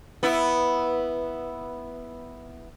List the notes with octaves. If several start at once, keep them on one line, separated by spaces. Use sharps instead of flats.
B3 E4